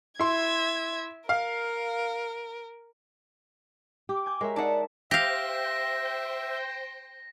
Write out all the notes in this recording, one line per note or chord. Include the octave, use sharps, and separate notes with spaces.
E4 E5 C6 G#6
A#4 F5
G4 D6
G#5 G6
G#3 A#4 C#5 E5
D#4 D5 E5 F#5 A5
G4 C5 E5 F5 G5 A#6